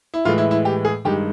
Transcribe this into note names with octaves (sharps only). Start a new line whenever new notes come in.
E4
A2 E3 G#3 F4
E4
E4
G4
G#4
G2 D#3 G#3 G4